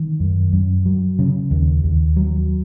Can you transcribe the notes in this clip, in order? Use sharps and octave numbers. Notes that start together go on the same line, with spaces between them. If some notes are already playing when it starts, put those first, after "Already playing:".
Already playing: D#3
F#2
F#2
F#3
C#3
D#2
D#2
F#3